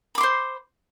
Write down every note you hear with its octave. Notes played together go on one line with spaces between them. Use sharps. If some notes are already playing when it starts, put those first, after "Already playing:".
C5 B5 C6 D6